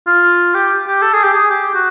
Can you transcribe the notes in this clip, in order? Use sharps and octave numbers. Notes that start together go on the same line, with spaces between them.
F4
G4
G4
A4
G#4
G4
G#4
G4
F#4